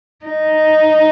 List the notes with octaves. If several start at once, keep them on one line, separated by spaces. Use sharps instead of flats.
D#4